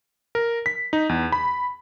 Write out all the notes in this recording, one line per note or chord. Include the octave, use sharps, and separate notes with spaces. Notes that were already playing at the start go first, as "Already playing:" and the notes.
A#4
B6
D#4
E2
B5